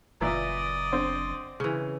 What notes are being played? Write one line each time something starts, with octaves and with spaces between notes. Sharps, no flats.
F#1 A#2 E3 D5 D#5 A#5
D3 C4
C#3 E3